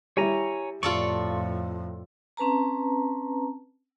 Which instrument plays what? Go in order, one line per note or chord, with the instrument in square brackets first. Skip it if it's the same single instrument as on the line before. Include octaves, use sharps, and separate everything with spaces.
[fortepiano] G3 E4 [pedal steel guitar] C#5 G#5 A#5
[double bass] F2 A2 [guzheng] F4 A4 D5 [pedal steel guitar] C#6
[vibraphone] C4 C#4 B4 A5 A#5